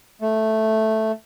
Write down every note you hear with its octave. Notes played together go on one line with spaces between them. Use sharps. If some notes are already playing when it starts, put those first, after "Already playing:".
A3